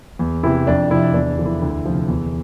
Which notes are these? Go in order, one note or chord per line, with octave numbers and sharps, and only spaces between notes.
E2
C3 E3 E4
F2 D4
C3 F3 E4
E2 D4
D3 F3
E4
D2
C3 F3
E2